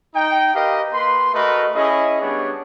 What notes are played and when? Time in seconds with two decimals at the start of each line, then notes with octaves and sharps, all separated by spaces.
0.15 D#4 G5
0.55 G4 A#4 B4 D#5 F5
0.93 A#3 B4 B5 C6
1.34 A3 F#4 A#4 B4 D#5
1.75 C#4 E4 G#4 D#5
2.21 G3 B3 D4 G#4 C#5